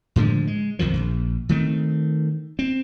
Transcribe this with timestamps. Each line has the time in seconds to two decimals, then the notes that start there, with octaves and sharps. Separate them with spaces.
0.16 A2 D3 F3 G#3
0.47 G#3
0.79 B1 F2 D#3 F3
0.94 A#1
1.49 D#3 A3 C4
2.59 C4